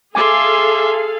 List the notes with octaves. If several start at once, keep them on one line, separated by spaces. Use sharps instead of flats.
G#4 A4 E5 F5 G#5 C6 D6